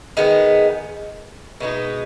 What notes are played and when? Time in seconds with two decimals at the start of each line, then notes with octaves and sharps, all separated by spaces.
0.17 D#3 G#3 B3
1.60 B2 G#3 B3 D#4